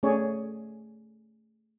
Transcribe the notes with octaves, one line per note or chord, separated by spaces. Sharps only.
A3 C#4 G#4 C#5 D5